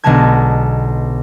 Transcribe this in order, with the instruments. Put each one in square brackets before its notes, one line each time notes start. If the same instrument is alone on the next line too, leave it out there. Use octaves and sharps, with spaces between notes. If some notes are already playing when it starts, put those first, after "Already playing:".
[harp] B1 D3 G#3 B3 A5 G#6